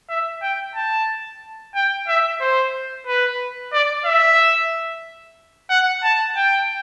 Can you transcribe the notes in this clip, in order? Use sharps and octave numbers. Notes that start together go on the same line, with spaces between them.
E5
G5
A5
G5
E5
C5
B4
D5
E5
F#5
A5
G5